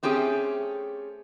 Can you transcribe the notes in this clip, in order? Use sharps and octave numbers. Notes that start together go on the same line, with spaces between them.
A3 C4 C#4 G4 G#4